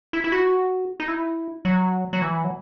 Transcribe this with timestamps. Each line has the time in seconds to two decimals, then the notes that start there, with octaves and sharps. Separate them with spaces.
0.13 E4
0.24 E4
0.32 F#4
1.00 D#4
1.08 E4
1.65 F#3
2.13 F#3
2.22 E3
2.44 F#3